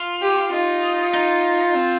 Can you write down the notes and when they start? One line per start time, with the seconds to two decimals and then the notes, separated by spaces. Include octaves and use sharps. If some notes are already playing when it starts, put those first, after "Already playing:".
Already playing: F4
0.22 G4
0.52 D#4 F4
1.13 D#4
1.75 C4